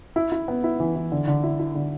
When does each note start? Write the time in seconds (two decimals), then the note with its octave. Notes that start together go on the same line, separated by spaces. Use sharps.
0.16 E4
0.32 E4
0.48 B3
0.64 E4
0.80 E3
0.96 E3
1.12 D3
1.28 D3
1.43 E4
1.59 E4
1.75 D3